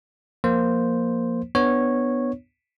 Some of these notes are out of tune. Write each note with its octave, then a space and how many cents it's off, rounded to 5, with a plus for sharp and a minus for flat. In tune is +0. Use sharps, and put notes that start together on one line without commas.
F3 +0 A#3 +0 C5 +0
B3 +0 D4 +20 C#5 -10